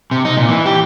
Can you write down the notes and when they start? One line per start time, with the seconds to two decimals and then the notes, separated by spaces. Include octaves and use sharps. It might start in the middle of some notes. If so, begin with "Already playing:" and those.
0.11 C3
0.25 D#4
0.37 A#2
0.49 E3
0.66 G4